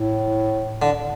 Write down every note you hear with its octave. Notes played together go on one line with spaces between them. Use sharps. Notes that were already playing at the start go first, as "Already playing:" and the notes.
Already playing: A2
D3